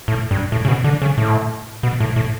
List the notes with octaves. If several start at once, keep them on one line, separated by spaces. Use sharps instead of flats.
A2
G2
A2
C#3
B2
D3
C#3
A2
B2
A2
A2